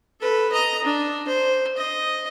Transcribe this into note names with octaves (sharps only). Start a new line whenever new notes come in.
A4 B4
D#5 A#5
D4
C5
D#5